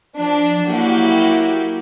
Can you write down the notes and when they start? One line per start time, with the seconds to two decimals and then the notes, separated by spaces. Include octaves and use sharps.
0.18 F3 D4
0.66 F#3 A#3 E4 F#4 G4